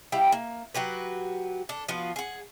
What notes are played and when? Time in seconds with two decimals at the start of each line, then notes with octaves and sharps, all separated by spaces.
0.12 G3 E4 F5 G5
0.32 A#3
0.74 F#3 F#4 G4 B4
1.69 D4 A4
1.89 F3 B3 F4 F#4
2.16 G#4 F#5